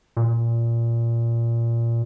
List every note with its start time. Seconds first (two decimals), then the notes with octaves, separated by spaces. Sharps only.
0.17 A#2